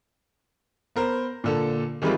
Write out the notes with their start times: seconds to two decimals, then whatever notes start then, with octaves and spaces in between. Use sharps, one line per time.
0.96 B3 A#4 C5
1.44 A#2 D3 A4
2.02 D#3 E3 G3 G#3 C4 F4